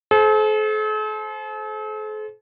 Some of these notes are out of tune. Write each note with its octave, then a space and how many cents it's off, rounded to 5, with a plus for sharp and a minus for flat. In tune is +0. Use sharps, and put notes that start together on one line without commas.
A4 -45 C5 +0